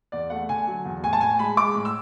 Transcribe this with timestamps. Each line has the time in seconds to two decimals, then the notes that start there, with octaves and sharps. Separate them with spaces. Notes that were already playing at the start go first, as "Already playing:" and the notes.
0.12 E2 D5
0.30 A3 F#5
0.49 D3 G#5
0.67 F#3
0.85 E2
1.04 A2 G#5
1.13 A5
1.21 A2 G#5
1.39 G#3 B5
1.57 G#3 D6
1.75 A2
1.85 E6